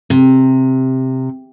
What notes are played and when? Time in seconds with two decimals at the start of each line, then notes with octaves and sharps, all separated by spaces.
0.10 C3